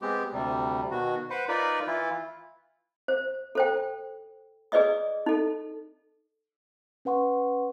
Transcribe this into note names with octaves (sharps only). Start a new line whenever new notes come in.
G#3 B3 C4 G4
D2 C3 G3
B2 D#3 F#4
B4 C5 F#5
D#4 F4 A#4 B4 D5 B5
E3 E4 F4
C5
A4 C5 G5
G#4 B4 D5 D#5 D#6
D#4 A4
C#4 B4 F#5 C6 C#6